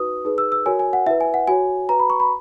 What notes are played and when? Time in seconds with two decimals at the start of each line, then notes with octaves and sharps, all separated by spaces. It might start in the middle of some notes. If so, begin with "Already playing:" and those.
Already playing: D#4 F#4 B4 D#6
0.25 D#4 G#4 B4
0.38 E6
0.52 E6
0.66 F#4 A#4 C#5 G#5
0.79 G#5
0.93 F#5
1.06 E4 B4 E5
1.21 G#5
1.34 F#5
1.48 F#4 C#5 G#5
1.89 F#4 B4 A#5
1.99 B5
2.10 C#6
2.20 B5